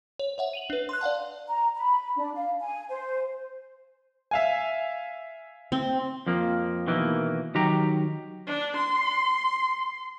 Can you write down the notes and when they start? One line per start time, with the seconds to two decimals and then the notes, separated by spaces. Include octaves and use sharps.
0.19 C#5
0.38 C#5 E5 F#5
0.53 D#7 F7 F#7
0.70 D4 B4
0.89 C6 F#6
1.01 D5 F5 F#5 A5
1.47 A#5
1.76 B5
2.17 D4
2.34 F5
2.61 G#5
2.89 C5
4.31 E5 F5 G#5
5.72 C4
6.27 F2 F3 A#3
6.87 B2 D#3 E3 A#3
7.55 D#3 F#3 G4 A#5
8.47 D4
8.77 C6